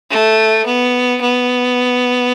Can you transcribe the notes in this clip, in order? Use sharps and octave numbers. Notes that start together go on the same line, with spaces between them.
A3
B3
B3